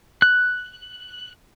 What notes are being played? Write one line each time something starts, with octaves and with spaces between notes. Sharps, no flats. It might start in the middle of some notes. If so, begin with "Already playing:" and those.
F#6